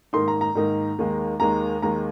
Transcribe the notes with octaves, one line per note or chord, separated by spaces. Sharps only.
G#2 D#3 A#3 D#4 C6
A#5
A#5
G#2 D#3 A#3 D#4
D#2 D#3 G#3
D#2 D#3 G#3 A#5
D#2 D#3 G#3 A#5